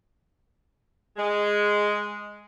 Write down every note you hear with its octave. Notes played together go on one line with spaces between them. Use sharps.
G#3